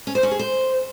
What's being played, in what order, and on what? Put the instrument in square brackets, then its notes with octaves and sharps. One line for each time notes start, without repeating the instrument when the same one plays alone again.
[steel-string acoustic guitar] C#4
C5
C#4
G#4
C5